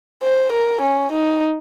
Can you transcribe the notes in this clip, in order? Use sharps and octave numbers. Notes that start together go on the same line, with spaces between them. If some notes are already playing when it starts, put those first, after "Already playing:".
C5
A#4
C#4
D#4